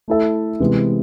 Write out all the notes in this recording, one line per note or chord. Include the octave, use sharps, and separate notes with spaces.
A3 E4 A4 E5
C3 E3 G#3 B3